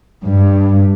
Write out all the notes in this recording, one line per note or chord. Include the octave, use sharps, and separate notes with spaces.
G2